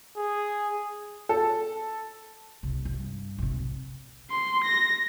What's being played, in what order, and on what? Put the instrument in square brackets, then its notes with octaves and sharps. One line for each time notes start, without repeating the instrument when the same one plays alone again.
[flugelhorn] G#4
[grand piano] A4
[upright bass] C2
G2
B1 C3
[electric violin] C6
A#6